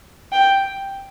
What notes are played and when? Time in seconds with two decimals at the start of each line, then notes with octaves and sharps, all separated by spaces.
0.32 G5